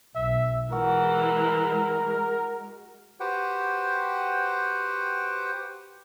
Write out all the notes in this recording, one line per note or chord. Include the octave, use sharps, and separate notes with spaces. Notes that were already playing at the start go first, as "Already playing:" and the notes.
B1 E5
E3 G#3 F#4 A#4
F#4 G4 B4 C5 F#5 G5